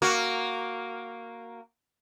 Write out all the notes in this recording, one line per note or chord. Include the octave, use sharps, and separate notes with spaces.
A#3 F#4